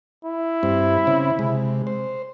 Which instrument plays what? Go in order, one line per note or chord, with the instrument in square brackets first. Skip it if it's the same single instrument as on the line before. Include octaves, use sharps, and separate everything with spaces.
[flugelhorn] E4
[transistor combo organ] G2 C4
C#3 C4
C3 G#3
C5